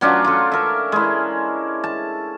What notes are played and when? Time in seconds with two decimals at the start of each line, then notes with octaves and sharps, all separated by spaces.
0.01 F#3 C#4 D4 F4
0.24 F4 A4
0.52 A#4 E5
0.92 G#3 E4
1.84 A5